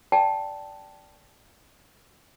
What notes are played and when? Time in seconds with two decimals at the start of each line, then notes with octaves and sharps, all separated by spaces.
0.12 D5 G5 A5